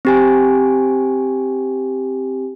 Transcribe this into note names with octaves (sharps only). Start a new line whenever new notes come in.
C4 G4 G#5